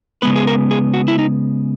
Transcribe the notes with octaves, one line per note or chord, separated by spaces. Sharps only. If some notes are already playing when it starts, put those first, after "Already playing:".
C#3 G#3 B3 B4
G#4
A#4
G#4
F#4
E4
D#4